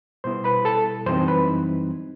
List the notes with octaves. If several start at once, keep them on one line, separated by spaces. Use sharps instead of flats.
B2 G3 B3 E4 C5 C6
B4 B5
A4 A5
F#2 E3 G3 C4 D#4 C5 C6
B4 B5